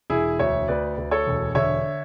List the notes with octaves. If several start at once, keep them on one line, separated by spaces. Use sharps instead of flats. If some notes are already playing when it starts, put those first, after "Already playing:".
E1 E4 G#4
D2 C#5 E5
D2 B4 D5
D2
A4 C#5
E1
D3 C#5 E5